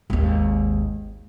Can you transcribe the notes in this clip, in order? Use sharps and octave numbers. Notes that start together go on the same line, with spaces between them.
G#1 D#2